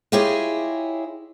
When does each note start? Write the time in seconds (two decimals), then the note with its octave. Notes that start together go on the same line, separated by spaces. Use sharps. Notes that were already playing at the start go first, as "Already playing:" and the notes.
0.12 E4 F4 G4 G#4 C#5 D#5